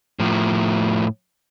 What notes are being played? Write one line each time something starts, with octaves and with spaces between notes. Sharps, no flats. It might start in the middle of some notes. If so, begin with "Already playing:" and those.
A2 F3